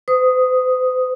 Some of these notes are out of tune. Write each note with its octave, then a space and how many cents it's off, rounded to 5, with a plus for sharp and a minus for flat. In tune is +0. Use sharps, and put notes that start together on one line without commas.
C5 -45 D#6 +0